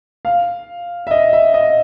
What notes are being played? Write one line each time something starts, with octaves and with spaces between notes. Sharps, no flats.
F5
E5
D#5
E5
D#5